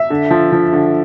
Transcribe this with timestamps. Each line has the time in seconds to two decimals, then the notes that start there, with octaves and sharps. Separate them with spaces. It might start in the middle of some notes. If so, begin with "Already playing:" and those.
Already playing: E5
0.10 D3
0.31 F3
0.52 F3
0.73 D3